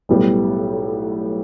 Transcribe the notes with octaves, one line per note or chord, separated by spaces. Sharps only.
B1 A2 G3 B3